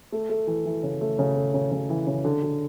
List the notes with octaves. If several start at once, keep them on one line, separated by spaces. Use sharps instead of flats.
A3
A3
E3
E3
C#3
A3
C#3
A3
C#3
C#3
E3
C#3
D3
D3